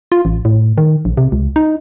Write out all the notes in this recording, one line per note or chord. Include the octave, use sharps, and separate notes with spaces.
F4
A1
A2
D#3
A#1
C3
C#2
D#4